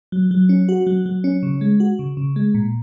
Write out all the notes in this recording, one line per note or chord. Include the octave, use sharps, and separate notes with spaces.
F#3
F#3
C#4
F#4
F#3
F#3
C#4
C#3
G#3
F#4
C#3
C#3
G#3
A#2